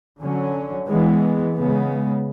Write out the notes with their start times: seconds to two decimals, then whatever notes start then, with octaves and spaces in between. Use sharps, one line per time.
0.19 D3 F#3 C#4
0.88 E3 G#3 B3
1.55 C#3 G#3 B3